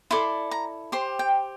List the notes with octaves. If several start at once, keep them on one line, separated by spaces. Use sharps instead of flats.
E4 A4 D5 C6
A#5
G4 C5 C6
G5